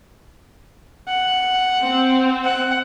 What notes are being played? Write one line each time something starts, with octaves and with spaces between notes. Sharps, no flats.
F#5
C4
F#5